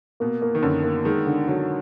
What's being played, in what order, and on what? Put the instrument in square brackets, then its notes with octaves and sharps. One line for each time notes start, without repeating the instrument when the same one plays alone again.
[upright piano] B2 [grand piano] A#3
[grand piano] A#3
[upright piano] D#3
[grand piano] F#2 [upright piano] D3
[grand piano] A#3
[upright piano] D#3 [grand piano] G#3
[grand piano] D3
[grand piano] D3 [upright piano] F#3